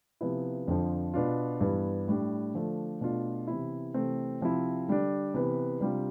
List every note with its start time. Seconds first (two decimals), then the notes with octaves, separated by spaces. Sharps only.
0.21 C3 F3 B3 E4
0.68 F2 D3 F3
1.14 B2 B3 D4 F4
1.61 G2 E3 B3
2.08 A2 G3 D4
2.54 D3 F3 A3 D4
3.01 B2 A3 D4 F4
3.47 C3 E3 B3 E4
3.94 C3 E3 A3 C4
4.41 C3 F3 C4 E4
4.88 D3 G3 D4
5.34 C3 E3 B3
5.81 C3 G3 D4 F4